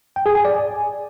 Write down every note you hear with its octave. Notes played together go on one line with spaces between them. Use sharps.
G5
G#4
G#5
D5
G#5